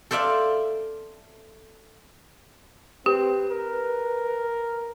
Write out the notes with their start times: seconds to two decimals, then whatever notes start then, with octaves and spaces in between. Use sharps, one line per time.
0.11 A4 C5 D5 E5 F5
3.06 C4 G4 B4
3.51 A#4